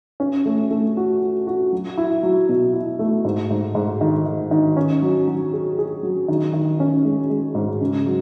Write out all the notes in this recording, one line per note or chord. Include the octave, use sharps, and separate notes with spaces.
C#4
A3
A3
F#4
F#4
F#4
F#3
E4
F#3
B2
E4
A3
G#2
G#2
G#2
D#3
D#3
D#3
C#4
F#3
F#3
G#4
G#4
F#3
D#3
D#3
C#4
G#3
G#3
G#2
C#3
F#3